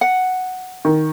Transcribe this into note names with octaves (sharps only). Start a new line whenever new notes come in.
F#5
D#3